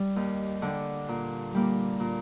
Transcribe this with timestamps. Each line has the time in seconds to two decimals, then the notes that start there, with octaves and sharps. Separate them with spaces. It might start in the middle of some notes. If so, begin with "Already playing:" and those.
Already playing: G3
0.16 D#2
0.62 D3 G3
1.08 A#2
1.54 G3 A#3
2.00 A#2